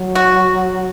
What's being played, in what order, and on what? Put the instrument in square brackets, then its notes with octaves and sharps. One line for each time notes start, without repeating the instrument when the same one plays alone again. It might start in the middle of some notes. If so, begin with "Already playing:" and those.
Already playing: [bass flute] F#3
[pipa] F#4